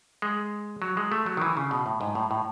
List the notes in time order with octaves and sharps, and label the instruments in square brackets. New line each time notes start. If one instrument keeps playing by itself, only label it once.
[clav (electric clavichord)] G#3
F#3
G#3
A3
F#3
D#3
E3
C#3
B2
A2
G#2
A2
A2